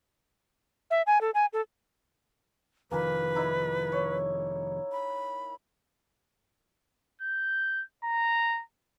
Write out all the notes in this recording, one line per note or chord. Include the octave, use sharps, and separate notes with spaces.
E5
G#5
A4
G#5
A4
F1 D#3 F3 A#3 B4 G#5
D#4 E4 D5
C#5
B5
G6
A#5